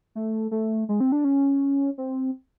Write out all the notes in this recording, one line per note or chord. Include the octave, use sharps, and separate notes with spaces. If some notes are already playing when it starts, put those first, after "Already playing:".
A3
A3
G#3
C4
D4
C#4
C4